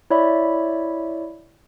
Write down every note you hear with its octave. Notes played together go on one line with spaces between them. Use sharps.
E4 C#5 D5 E5 B5